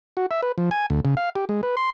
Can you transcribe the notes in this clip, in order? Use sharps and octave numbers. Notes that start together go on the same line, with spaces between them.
F#4
E5
B4
F3
G#5
D2
C#3
F5
G4
G#3
B4
C6